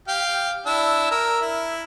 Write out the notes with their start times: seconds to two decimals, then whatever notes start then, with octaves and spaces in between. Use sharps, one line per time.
0.08 G4 F5 G5
0.66 D4 E4 E6
1.11 A#4 E6
1.41 E4